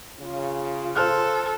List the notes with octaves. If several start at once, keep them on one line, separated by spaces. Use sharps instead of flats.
C#3 F4
A4 C5 F6 F#6